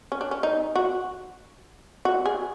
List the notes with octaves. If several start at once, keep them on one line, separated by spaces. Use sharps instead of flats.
C#4
D4
C#4
D#4
F#4
F#4
G#4